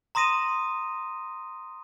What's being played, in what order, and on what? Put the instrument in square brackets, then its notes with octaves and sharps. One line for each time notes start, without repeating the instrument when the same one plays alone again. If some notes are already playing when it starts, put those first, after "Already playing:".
[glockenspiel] A#5 C6 D#6 A#6 D#7 E7